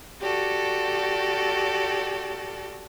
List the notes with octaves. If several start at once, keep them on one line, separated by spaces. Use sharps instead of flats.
F#4 G4 A4 D5